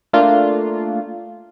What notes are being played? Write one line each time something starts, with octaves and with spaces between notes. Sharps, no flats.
A3 A#3 D4 F4